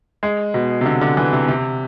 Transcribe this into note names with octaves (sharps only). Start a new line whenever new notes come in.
G#3
B2
C3
D3
D3
E3
C3
C3